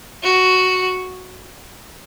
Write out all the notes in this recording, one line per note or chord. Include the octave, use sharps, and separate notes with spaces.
F#4